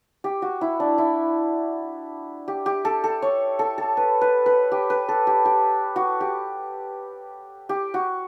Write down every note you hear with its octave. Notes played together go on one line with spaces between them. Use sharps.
G4
F#4
E4
D4
E4
G4
G4
A4
A4
C#5
A4
A4
B4
B4
B4
G4
B4
A4
G4
G4
F#4
G4
G4
F#4